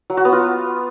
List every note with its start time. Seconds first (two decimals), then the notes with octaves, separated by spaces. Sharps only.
0.10 F#3
0.17 F#4
0.25 B3
0.32 F4